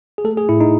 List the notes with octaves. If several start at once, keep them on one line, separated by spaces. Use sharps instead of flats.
G#4
A3 A4
G#4
A2 E4
D#4